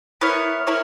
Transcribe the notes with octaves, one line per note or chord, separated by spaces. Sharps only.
B3 E4 A#4 C#5
E4 A#4 C#5